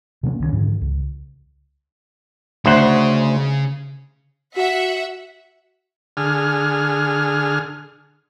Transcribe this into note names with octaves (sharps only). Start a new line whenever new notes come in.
C3 F3 A#3 C#4
C2 D#3 G#3 C#4
G#2 D3 E3 F3
C#2
D2 C#3 C5 F#5
F#4 E5 F#5
D3 G#4 F6